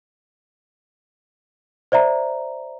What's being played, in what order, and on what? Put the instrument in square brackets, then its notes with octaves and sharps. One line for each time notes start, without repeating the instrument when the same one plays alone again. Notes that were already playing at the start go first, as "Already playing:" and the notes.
[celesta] C5 D5 E5 A#5